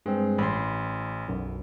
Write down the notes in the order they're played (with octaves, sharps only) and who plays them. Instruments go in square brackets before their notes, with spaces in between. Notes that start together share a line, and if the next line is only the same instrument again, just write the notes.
[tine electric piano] G2 C4 [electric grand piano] G#3
[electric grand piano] A1 [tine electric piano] B5 C6
[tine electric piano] B1 F#2